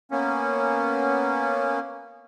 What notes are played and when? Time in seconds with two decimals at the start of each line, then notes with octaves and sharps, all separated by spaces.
0.11 A#3 B3 C#4